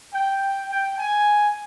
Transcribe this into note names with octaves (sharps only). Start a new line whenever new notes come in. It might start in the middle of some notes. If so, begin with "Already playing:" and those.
G5
G5
G#5